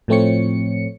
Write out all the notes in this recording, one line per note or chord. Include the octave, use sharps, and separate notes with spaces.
A2 F3 A3 C4 C#5 C#7